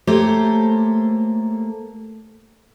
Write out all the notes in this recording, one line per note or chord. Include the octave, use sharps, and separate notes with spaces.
A3 A#3 G4 C5 C#5